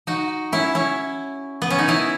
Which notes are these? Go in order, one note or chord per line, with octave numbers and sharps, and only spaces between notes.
D#4 F#4
C#4 E4
C#4 E4
B3
C#4
D#4
C#4 E4